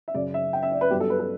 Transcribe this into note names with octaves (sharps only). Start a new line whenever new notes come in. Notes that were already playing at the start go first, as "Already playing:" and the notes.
E5
F#2 C#3 F#3 D5
E5
G5
E5
D5
B4
G2 F#3 B3 G4
A4
B4
A4